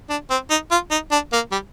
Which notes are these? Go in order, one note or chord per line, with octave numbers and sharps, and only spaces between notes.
D4
C4
D#4
F4
D#4
D4
A#3
G3